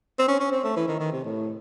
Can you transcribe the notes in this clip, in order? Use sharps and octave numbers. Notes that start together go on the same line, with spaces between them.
C4
C#4
C#4
C4
A3
E3
D#3
D#3
C3
A2